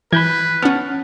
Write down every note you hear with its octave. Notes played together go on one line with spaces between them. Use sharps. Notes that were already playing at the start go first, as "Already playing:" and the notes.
E3 B4 B5 G6 G#6
B3 C#4 F#5 A5 F6